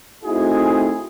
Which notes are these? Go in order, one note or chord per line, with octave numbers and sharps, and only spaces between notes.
A3 C4 D#4 E4 F#4 G#4